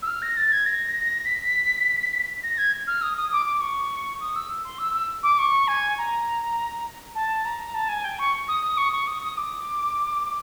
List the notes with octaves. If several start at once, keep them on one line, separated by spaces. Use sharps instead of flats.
E6
F6
A#6
A6
G#6
A#6
B6
A#6
G#6
F6
D#6
D#6
D6
D6
C#6
D#6
E6
C6
E6
E6
D6
C#6
G#5
A#5
A5
A#5
A5
G#5
G5
C#6
D#6
D#6
C#6
C#6
D#6
D#6
D6